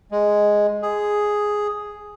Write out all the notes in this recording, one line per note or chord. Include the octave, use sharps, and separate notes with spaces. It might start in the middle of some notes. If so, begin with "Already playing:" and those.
G#3
G#4